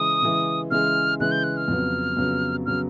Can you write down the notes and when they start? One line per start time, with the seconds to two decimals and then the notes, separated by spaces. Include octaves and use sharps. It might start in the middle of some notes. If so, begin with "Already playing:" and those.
Already playing: C#3 E3 G#3 D#6
0.22 C#3 E3 G#3
0.71 C#3 E3 G#3 F6
1.20 C#3 E3 G#3 F#6
1.31 G6
1.44 F#6
1.57 F6
1.68 F2 C#3 F#3 B3
2.17 F2 C#3 F#3 B3
2.66 C#3 F#3 B3 F6